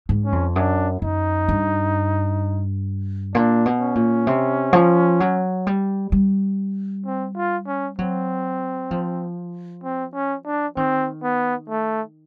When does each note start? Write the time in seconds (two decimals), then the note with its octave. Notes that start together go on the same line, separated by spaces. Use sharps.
0.09 G#2
0.25 C#4
0.32 F2
0.56 F#2 D4
1.02 F#2 D#4
1.49 G2
3.34 A#2 D4
3.66 B2
3.80 C#4
3.95 A#2
4.27 C3
4.73 F3
5.20 F#3
5.67 G3
6.12 G3
7.06 C4
7.36 F4
7.67 C#4
7.99 F#3 C4
8.91 F3
9.83 C4
10.14 C#4
10.45 D4
10.76 D#3 C4
11.23 B3
11.69 A3